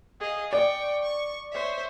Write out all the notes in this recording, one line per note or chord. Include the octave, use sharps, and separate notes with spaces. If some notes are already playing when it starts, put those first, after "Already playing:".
G#4 D#5 F5
D5 G5 C#6
C#6
C5 C#5 E5